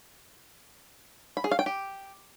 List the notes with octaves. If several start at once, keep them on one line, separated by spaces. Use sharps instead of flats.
B5
G#4
F5
G5
G4